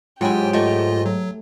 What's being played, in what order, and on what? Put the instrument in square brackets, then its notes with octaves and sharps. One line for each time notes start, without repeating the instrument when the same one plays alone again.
[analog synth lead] G#2 [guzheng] F#3 E4 [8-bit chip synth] F4 G5 G#5 [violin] G4
[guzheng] A3 [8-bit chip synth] F4 D#5
[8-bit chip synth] F#3